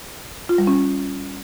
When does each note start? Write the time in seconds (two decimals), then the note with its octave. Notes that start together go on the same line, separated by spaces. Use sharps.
0.49 F4
0.58 G3
0.67 C#4